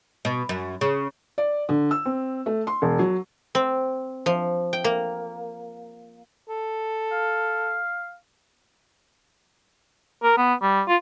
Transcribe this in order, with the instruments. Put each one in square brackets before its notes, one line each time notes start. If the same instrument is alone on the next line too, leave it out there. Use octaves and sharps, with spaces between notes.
[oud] B2
F#2
C#3
[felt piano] D5
D3
E6
C4
A3
C6
E1
F#3
[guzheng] C4
F3
G5
A#3
[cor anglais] A4
[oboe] F5
[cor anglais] A#4
B3
G3
F4